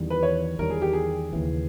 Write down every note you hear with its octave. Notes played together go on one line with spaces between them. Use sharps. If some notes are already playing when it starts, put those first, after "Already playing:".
Already playing: E2 D#3 G3
B4
C#5
E2 D#3 G3 A#4
G#4
G4
G#4
D#2 C#3 E3